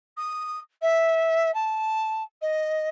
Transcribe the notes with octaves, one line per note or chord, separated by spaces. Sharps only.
D#6
E5
A5
D#5